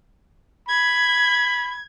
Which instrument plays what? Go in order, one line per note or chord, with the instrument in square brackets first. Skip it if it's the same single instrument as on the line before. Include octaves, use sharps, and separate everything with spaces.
[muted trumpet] B5 [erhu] G#6